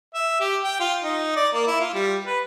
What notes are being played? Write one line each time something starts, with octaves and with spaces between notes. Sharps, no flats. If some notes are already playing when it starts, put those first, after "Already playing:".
E5
G4
G5
F4
D#4
D5
A#3
E4
F4
G3
B4